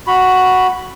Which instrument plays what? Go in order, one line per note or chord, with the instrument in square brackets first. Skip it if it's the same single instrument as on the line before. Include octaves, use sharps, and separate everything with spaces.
[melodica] F#4 B5